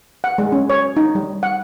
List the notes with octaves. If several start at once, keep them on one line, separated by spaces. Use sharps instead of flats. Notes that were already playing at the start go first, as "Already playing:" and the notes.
F#5
G#3
C#4
C#5
D#4
G3
F#5